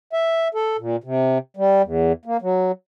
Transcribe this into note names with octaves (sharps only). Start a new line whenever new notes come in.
E5
A4
A#2
C3
G3
E2
A#3
F#3